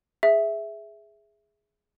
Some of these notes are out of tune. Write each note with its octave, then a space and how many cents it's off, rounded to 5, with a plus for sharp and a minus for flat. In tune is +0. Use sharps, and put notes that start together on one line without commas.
G#4 +0 E5 +0